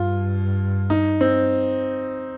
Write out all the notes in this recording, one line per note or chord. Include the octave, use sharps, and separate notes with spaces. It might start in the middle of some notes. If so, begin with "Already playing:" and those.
Already playing: G2 F4
D#4
C4